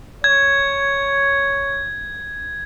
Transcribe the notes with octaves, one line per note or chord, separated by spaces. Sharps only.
C#5 G#6